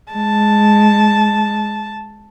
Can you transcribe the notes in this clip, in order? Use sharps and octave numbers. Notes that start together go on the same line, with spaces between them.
G#3 A5